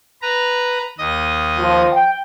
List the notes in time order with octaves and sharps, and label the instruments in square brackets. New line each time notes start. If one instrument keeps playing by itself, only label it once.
[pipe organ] B4 A#5
D#2 D#5 D#6
[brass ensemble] F3
G5